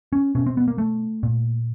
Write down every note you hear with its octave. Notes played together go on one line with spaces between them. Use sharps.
C#4
B2 C#4
C4
B3
A#3
A3
A#2